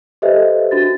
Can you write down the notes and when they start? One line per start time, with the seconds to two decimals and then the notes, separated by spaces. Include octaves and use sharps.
0.22 G4 A4 B4 C5 D#5 E5
0.71 D4 F#4 A6